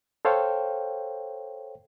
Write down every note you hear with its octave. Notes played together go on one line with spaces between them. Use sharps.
A4 C5 C#5 F5 G5